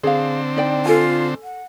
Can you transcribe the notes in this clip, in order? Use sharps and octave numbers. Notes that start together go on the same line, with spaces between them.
D3 C4 G#4 F5
D#4 D5 G5
F4 A4 G#5
F#5